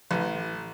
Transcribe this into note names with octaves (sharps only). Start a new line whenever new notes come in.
A1